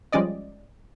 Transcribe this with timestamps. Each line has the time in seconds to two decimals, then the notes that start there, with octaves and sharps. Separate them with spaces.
0.12 F3 G3 G#3 C#4 D5 D#5